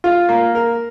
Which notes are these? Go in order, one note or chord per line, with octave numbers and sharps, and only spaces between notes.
F4
A#3
A#4